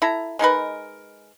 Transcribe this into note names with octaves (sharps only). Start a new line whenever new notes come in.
E4 A4 A#5
G#3 D#4 A#4 B4